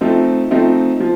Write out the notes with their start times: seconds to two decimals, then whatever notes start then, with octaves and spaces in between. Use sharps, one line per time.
0.01 F3 A3 C4 D#4
0.51 F3 A3 C4 D#4
1.00 F3